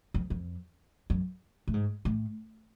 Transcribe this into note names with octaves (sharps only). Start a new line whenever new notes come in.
F2
F2
F#2
A2
G#2
A2